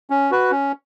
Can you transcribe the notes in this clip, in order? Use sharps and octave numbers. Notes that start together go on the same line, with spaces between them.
C#4
F#4 B4
C#4